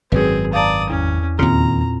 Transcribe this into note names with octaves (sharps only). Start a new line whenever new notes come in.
G#1 F#2 F#3 C4 G#4 B4
D5 F5 A5 A#5 D#6
E2 C#4
D#2 A#2 C#3 C4 F4 A#5